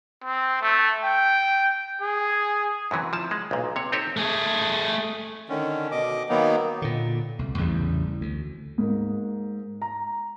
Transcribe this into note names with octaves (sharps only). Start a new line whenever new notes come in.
C4
A3
G5
G#4
F#2 C3 E3 F#3
F3 A5
G#3
B1 A#2
C3 C#5
C4 D#4 G4 A4 C#5
A3 G#4
D3 D#3 C#4
B2 D#5 D6
D#3 F#3 A#3 B3 D#4
A#2 D3
C2
A1 E2 C#3 G3
D2
G#2 A#3
A#5